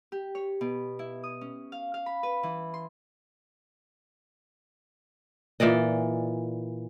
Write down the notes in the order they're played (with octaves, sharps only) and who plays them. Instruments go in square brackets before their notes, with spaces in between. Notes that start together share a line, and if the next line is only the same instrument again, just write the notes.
[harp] G4
C#5
B2
E4
D#6
C#4
F5
F5
B5
B4
E3
C6
[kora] A#2 E3 D5 D#5